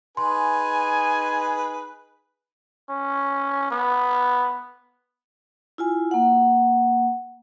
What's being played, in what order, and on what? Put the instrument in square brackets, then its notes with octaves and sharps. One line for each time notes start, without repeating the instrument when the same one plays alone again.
[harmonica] D#4 G#4 B4 [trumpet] G#5 [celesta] C6
[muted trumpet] C#4
B3
[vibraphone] E4 F4 G#5
A#3 F#5